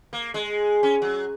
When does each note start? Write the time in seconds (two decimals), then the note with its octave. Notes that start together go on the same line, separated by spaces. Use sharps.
0.13 A#3
0.34 G#3
0.83 C#4
1.02 F#3